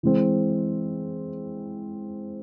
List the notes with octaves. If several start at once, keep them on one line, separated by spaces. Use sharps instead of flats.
E3 G#3 C4